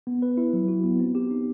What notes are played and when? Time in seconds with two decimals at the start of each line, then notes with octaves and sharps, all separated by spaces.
0.07 B3
0.22 B4
0.37 E4
0.53 F#3
0.68 F#4
0.84 B3
1.00 C4
1.15 G4
1.31 D#4